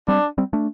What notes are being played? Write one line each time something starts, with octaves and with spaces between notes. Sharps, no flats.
G3 C4 D4
G3 C4
A3 D4